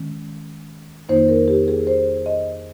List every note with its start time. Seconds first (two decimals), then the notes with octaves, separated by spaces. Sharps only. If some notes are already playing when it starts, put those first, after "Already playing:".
Already playing: D#3 G#3 C#4
1.09 F2 D#3 A#3 D#4 C5
1.28 A#4
1.48 G4
1.68 G#4
1.87 C5
2.26 D#5